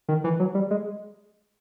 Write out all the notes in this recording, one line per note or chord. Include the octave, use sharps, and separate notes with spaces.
D#3
E3
F#3
G3
G#3